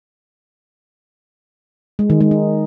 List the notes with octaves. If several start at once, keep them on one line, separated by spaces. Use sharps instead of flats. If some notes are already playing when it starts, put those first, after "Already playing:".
G#3
D#3
G#3
D#4